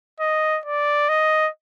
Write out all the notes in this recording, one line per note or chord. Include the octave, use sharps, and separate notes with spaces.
D#5
D5
D#5